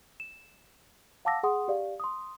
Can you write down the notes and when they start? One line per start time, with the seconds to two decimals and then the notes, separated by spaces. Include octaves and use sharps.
0.20 E7
1.25 F5 F#5 A5 D6 E6 A#6
1.43 G#4 F#5 C6 D#6
1.68 G4 D5 F5
2.00 C6 D#6